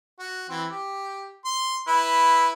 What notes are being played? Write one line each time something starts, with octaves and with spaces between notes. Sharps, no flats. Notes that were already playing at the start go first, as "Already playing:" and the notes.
F#4
E3 C4
G4
C6
E4 B4